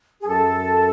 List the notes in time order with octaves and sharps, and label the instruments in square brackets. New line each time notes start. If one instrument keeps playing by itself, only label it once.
[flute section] G#4
[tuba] F#2 [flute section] A4